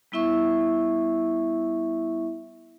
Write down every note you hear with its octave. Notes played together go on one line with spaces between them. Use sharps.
G3 B3 E4 E5 C#6